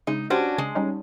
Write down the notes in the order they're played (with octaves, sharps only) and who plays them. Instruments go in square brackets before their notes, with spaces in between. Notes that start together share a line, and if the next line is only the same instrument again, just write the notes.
[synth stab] C#3 G#3 [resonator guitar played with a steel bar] D#4
[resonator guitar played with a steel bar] C#4 D4 F#4 [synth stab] G4 C5
[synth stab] C#3 [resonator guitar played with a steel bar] G#3
[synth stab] G3 C#4 D#4